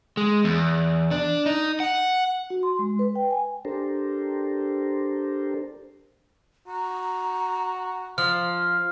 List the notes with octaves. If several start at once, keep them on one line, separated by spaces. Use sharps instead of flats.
G#3
E2
D4
D#4
F#5
F#4
C6
G#3
B4
G5
G#5
D4 G4 A4 A#4 C5
F#4 A#5
F3 F5 F6